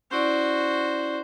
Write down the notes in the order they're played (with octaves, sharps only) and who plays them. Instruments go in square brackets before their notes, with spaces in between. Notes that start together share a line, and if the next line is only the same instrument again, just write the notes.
[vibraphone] C#4 E4 D5 [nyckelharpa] F#4 C5